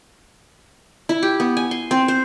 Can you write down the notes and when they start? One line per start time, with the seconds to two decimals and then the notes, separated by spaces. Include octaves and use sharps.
1.09 E4
1.23 G4
1.40 B3
1.57 G#5
1.71 C6
1.91 C4
2.08 C5